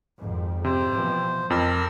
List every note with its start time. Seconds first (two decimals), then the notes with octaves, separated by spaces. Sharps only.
0.17 G#1 F2
0.64 C3 C5
0.95 B2 E3 F3
1.50 F1 F2 A#4 E6